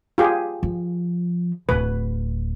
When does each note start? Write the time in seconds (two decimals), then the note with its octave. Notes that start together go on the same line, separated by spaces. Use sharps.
0.18 F4 G4 G#4
0.63 F3
1.69 D1 B4